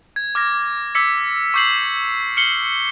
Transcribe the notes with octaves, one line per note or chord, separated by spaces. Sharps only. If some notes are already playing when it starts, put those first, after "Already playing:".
G#6
D6 F6 G#6 A#6
D6 E6 G#6 B6 C#7
C#6 D6 G6 C7 F#7
F6 C7 C#7 F#7 G7